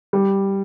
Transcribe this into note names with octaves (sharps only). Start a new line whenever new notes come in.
G3